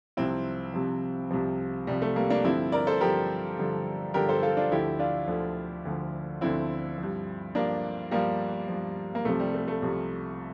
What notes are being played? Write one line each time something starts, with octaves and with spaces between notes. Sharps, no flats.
C2 C3 F3 C4 E4
C2 C3 F3
C2 C3 F3
C2 C3 F3 G3
A3
G3 A#3
A#3 D4
G2 D3 F3 C4 E4
A#4 D5
A4 C5
G2 D3 F3 G4 A#4
G2 D3 F3
G2 D3 F3 G4 A#4
A4 C5
F4 A4
D4 F4
D2 D3 F3 E4 G4
D4 F4
D2 D3 F3
D2 D3 F3
D2 D3 F3 C4 E4
G2 F3
G2 F3 A#3 D4
G2 F3 G3 A#3
G2 F3
A#3
C2 C3 F3 A3
G3
A3
A3
C2 C3 F3